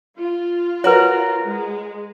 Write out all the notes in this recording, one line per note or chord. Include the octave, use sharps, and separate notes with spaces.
F4
F#4 A#4 B4 C#5
G#3